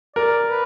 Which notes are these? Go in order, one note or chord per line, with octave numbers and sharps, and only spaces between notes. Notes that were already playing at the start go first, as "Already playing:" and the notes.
A#4 D5
B4